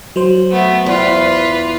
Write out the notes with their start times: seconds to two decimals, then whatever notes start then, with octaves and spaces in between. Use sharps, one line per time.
0.16 F#3 C5
0.51 A3 B3
0.86 E2 F4 B4